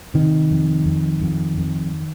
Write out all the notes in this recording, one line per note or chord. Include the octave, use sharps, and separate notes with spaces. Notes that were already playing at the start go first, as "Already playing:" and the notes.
C3 D#3
F2
F2
F2
F2